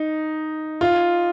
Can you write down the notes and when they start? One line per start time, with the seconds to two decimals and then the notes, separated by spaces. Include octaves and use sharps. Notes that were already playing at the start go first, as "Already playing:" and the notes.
Already playing: D#4
0.81 F4